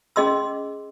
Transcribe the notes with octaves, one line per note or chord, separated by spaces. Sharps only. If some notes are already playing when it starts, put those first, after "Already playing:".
C#4 G#4 D#5 C6 E6